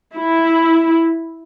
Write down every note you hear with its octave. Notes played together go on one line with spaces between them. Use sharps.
E4